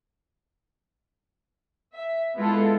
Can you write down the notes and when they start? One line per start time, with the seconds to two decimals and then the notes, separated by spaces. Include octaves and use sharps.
1.94 E5
2.36 G#3 B3 E4 F4 A4